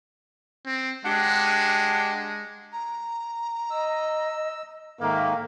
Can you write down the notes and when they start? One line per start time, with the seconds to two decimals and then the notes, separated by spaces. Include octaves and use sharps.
0.66 C4
1.05 G#3 D4 G4 F#5
2.73 A#5
3.70 D#5 E6
5.01 G#2 D#3 A#3 A4 E5